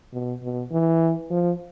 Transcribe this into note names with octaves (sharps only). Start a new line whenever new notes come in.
B2
B2
E3
F3